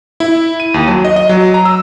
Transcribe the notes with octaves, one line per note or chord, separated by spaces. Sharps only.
E4
D#7
D#2
F#3
D#5
D#5
F#3
A#5
E6